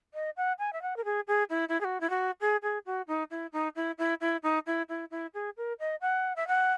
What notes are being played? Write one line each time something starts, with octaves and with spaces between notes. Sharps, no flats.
D#5
F#5
G#5
E5
F#5
A#4
G#4
G#4
E4
E4
G#4
F#4
E4
F#4
G#4
G#4
F#4
D#4
E4
D#4
E4
E4
E4
D#4
E4
E4
E4
G#4
A#4
D#5
F#5
E5
F#5